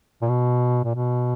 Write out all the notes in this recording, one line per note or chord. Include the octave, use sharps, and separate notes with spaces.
A#2
B2
A#2
B2